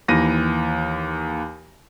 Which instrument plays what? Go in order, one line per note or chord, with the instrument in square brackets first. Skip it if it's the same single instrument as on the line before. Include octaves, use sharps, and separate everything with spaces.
[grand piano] D#2 E3 A#6 D#7